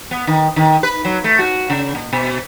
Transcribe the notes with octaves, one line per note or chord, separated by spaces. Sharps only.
B3
D#3
D#3
B4
F#3
A3
F#4
C#3
A#2
B2